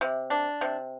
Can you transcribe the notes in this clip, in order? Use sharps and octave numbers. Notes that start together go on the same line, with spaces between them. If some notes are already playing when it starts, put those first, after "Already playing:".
C3
D4
C3